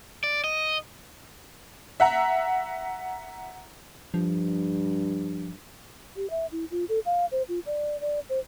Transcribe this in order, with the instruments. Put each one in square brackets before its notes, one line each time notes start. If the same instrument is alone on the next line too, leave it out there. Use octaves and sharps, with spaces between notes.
[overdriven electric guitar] D5
D#5
[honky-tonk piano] E5 F#5 A#5
[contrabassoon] G2 [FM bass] F3
[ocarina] G4
E5
E4
F4
A4
F5
C5
F4
D5
D5
C5